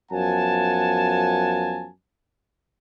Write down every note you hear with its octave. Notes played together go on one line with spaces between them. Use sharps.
F#2 F3 B3 F#5 G#5 A5